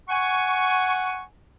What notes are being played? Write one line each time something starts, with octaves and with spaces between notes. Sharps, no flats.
F#5 G#5 C#6